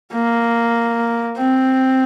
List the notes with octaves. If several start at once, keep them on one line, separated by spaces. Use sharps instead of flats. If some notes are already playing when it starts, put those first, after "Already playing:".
A#3
C4